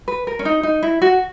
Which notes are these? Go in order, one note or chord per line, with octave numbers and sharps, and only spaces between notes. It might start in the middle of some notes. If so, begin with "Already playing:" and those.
B4
A#4
C#4
D#4
D#4
E4
F#4